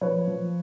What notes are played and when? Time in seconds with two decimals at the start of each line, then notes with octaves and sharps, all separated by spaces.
0.01 F3 B4 C#5
0.27 F3